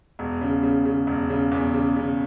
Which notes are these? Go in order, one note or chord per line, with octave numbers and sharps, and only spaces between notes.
E1
C#3
C#3
C#3
E1
C#3
E2
C#3
C#3